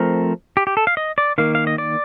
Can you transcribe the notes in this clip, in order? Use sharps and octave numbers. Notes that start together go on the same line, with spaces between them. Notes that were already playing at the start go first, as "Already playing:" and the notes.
Already playing: F3 A3 C4 A#4
G4
G4
A4
F5
D#5
D5
D#3 A#3 F5
F5
D#5
D5